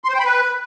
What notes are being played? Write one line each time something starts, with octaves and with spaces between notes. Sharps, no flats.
C6
C5
G5
B5
B4